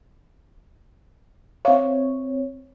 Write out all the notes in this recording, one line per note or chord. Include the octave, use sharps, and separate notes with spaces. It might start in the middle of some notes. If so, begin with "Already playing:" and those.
C4 C#5 E5 F5